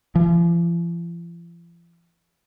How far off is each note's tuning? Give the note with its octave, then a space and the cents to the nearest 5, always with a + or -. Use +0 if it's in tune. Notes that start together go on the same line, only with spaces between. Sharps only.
F3 -45